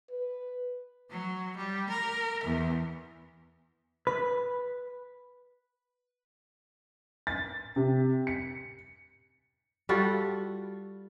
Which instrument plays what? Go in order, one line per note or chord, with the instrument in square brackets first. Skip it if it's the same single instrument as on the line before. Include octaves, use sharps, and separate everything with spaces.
[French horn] B4
[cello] F#3
G3
A#4
E2
[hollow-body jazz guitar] B4
[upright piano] A6
C3
C#7
[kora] G3 F4 F#4 A4